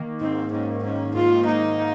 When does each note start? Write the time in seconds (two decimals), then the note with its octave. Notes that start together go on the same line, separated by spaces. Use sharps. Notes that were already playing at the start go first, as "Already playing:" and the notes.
Already playing: D#3 A#3
0.20 G#2 C4
0.51 G#2 C#4
0.83 G#2 C#4
1.15 G#2 F4
1.46 A#3 D#4
1.77 D#3